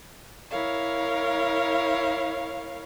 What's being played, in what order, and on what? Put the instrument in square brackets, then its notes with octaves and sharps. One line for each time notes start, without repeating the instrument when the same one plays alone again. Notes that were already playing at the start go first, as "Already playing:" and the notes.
[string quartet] E4 A#4 C#5 F5